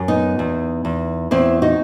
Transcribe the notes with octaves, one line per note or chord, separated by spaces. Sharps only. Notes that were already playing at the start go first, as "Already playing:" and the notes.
Already playing: F#2
B3 D#4
E2
E2
E2 C4 E4
D#4 F#4